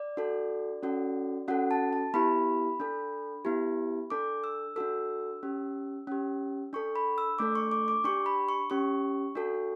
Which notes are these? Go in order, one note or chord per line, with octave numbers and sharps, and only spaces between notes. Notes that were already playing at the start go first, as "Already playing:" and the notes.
Already playing: D5
D4 F#4 A4
C#4 F#4 A4
C#4 F#4 A4 F#5
A5
A5
B3 E4 G4 B5
D4 A4
B3 E4 G4
D4 A4 D6
E6
D4 F#4 A4 E6
C#4 G4
C#4 G4
D4 A4 C#6
B5
E6
A3 D4 A4 D6
C#6
D6
D6
D4 G4 C#6
B5
C#6
C#4 G4 C#6
D4 F#4 A4